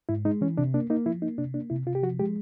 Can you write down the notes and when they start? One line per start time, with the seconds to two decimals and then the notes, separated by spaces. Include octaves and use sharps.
0.09 G#2 E4
0.25 G#3 D#4
0.41 E3 C#4
0.58 C3 D4
0.74 A#3 D4
0.90 A#3 D#4
1.06 F3 E4
1.22 A#3 D#4
1.38 C3 D4
1.54 A#3 D4
1.70 C3 E4
1.86 C3 F4
1.95 G4
2.03 F3 F#4
2.19 G#3 G4